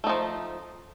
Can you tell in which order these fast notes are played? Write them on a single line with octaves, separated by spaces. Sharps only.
A3 D#4 F3